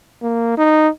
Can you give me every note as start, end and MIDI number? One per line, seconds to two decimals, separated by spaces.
0.23 0.54 58
0.58 0.89 63